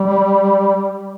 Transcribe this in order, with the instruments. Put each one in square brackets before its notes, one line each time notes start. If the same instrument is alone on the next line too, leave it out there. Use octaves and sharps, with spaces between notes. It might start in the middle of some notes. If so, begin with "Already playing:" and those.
Already playing: [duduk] G3